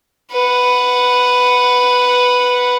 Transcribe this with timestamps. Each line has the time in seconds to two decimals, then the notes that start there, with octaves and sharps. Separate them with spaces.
0.32 B4 F#5